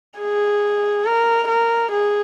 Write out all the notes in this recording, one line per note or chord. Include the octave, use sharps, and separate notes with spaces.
G#4
A#4
A#4
G#4